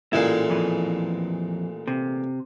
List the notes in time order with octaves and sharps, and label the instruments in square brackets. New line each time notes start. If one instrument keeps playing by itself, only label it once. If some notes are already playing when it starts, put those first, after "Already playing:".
[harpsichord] A1 A#2 G#3 [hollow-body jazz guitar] E4
[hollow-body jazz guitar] F2 E3
C3